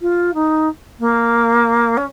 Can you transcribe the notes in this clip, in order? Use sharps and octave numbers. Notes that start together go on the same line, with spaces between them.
F4
D#4
A#3
C#4